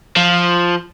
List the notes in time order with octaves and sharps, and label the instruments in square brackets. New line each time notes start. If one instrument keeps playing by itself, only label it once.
[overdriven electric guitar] F3